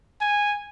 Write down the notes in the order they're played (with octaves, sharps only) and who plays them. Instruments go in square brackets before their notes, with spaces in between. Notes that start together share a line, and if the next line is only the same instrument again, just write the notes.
[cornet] G#5